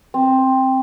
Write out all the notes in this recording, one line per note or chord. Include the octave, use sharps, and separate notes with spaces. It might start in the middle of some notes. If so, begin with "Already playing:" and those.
C4